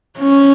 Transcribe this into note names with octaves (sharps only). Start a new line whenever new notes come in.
C#4